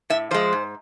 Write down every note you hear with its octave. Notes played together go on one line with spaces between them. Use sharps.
A2 E5
F3 G#3 C5
G#2